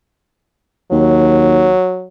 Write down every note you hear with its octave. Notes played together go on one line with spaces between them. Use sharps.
D#2 F#3